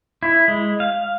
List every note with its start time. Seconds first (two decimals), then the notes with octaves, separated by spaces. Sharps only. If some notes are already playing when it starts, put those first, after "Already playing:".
0.23 E4
0.48 G#3
0.80 F5